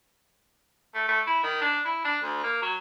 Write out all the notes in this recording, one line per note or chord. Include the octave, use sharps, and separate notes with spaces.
A3
A3
E4
D#3
D4
E4
D4
D2
A#3
F#3